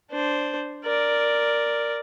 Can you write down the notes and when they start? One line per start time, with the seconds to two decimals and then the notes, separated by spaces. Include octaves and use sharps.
0.11 D4 C5
0.85 A#4 D5